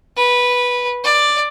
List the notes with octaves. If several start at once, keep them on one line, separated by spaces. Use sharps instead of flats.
B4
D5